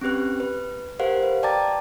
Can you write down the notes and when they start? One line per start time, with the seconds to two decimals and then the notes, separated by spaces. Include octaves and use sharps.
0.01 C4 C#4 G4 B4 F#6
0.40 B4
1.00 G4 A#4 C5 F5 F#5
1.23 B4
1.43 D5 G5 A5 A#5 D6 A6